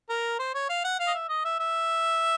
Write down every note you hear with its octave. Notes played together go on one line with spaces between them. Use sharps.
A#4
C5
C#5
F5
F#5
F5
D#5
E5
D#5
E5
E5